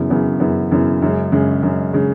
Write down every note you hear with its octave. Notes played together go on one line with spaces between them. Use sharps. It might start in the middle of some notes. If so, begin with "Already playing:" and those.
Already playing: F#2 C#3 E3 B3
F#2 C#3 E3 B3
F#2 C#3 E3 B3
F#2 C#3 E3 B3
F#2 C#3 G#3
F#2 C#3 G#3
F#2 C#3 G#3
C#3 G#3